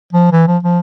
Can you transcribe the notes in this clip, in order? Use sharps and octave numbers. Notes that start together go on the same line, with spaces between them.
F3
E3
F3
F3